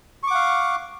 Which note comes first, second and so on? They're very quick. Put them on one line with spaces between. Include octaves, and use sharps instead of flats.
C#6 D6 F#5 F5